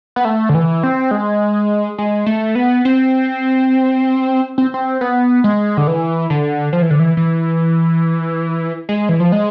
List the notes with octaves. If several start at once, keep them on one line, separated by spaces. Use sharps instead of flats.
B3
A3
D3
E3
C4
G#3
G#3
A3
B3
C4
C4
C4
B3
G#3
D3
E3
D3
F3
E3
D3
E3
E3
G#3
E3
F3
G#3